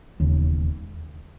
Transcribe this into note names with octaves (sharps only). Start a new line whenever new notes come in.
E1 D#2 C#3